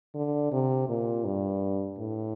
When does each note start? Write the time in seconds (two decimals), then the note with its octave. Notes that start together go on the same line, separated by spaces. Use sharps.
0.15 D3
0.52 C3
0.89 A#2
1.25 G2
1.99 A2